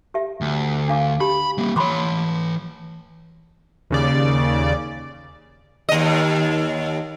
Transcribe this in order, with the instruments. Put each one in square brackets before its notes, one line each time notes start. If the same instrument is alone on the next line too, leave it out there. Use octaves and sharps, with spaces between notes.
[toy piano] G4 E5
[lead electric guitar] D2
[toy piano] D4 F5 D6
[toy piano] G4 [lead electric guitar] B5
[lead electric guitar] G3 A#3
[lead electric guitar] E3 C#5 [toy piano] B5 C6 D6
[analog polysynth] D#2 C#3 D5
[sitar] D#2 D#5